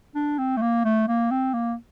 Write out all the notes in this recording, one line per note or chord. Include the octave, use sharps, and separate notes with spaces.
D4
C4
A3
A#3
A3
A#3
C4
A#3